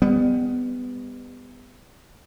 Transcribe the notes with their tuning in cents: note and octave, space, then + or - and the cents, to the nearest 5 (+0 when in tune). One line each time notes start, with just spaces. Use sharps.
G3 +40 B3 +20